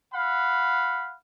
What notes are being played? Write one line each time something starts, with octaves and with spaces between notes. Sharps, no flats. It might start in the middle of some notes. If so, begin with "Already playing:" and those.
F5 F#5 B5